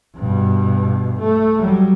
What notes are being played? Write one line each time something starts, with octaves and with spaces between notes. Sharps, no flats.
G2 B2
A3
F#3 G3